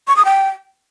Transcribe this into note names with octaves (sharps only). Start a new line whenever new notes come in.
C#6
D#6
G5